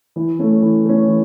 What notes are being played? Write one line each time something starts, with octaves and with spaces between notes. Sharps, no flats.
E3
A3 C#4
E3
A3 C#4
E3